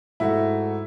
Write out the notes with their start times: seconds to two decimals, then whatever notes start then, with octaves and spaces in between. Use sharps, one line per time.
0.20 G#2 A3 E4 F#4